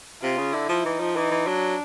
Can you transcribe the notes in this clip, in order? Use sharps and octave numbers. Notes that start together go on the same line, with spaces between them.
C3 F4
C#3
D3 E4
F3
E3 D#4
F3
E3 D#4
E3
F#3 D4